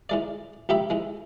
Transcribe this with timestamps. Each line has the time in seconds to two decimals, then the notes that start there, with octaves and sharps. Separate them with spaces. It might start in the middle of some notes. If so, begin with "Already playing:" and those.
0.09 E3 G#3 D5
0.69 C#2 G4 E5 B5
0.90 E3 G#3